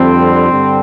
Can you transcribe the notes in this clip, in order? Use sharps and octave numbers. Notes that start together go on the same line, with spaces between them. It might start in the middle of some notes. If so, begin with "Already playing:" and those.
Already playing: F2 D3 G3 C4
G2 D3 G3